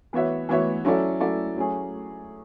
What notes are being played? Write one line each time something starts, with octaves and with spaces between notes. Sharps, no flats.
E3 B3 F#4 C#5 E5
E3 B3 F#4 C#5 E5
F#3 C#4 E4 A4 D5
F#3 C#4 E4 A4 D5
F#3 A3 C#4 G#4